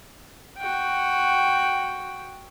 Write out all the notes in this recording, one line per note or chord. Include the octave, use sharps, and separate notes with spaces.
F#4 G5